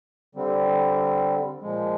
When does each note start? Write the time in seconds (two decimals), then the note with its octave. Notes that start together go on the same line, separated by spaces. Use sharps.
0.35 D3 G3 C4
1.61 A#2 F3 G#3